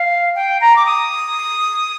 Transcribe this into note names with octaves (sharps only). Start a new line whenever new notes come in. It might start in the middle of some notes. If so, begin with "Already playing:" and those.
Already playing: F5
G5
A#5
D6
D#6